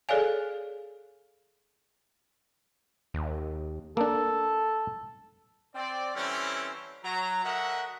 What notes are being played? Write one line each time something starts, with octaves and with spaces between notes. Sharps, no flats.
G#4 A4 C#5 D5 F5 G#5
D#2
A#3 D4 A4
C4 D5
D3 E3 G3 C4 C#4
F#3 A#5
D3 F#4 A#4 D#5 E5 F#5